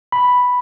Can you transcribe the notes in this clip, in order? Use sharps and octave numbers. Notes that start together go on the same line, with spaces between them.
B5